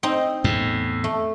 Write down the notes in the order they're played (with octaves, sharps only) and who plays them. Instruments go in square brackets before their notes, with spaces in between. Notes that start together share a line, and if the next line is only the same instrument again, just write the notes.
[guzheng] C4 D#4
[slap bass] E2 A2
[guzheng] A3